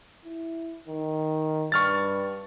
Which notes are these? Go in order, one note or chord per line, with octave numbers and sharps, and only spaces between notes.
E4
D#3
G2 C#6 F6 A6